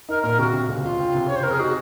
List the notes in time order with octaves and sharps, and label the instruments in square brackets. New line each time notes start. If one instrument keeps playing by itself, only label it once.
[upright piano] D#4 [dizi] A#4
[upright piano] A#2 [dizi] A#4
[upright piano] C3 [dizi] F#4
[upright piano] C3
C#2
[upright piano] C#2 [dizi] F4
[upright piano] C4
C3
[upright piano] C#3 [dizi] C#5
[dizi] C5
[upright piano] F2 [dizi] A#4
[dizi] G#4
[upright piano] D#4 [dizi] F#4